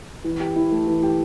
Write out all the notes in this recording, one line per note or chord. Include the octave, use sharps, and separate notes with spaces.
E3
G4
E4
A3
E3
G4